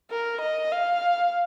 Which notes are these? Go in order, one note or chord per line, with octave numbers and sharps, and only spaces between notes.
A#4
D#5
F5